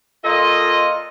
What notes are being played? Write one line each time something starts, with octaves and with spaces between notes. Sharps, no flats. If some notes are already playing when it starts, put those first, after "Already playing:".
A#2 F4 A4 D#5